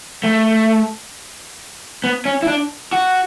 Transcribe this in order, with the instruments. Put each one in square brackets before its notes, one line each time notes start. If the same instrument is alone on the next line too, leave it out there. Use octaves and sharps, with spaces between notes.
[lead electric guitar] A3
B3
C#4
E4
D4
F#4